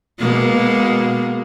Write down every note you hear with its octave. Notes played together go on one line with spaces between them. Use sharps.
B2 G#3 A#3